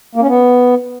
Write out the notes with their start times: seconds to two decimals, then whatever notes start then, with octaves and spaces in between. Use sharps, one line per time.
0.15 A#3
0.21 C#4
0.28 B3